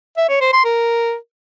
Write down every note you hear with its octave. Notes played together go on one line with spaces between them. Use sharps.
E5
C#5
C5
C6
A#4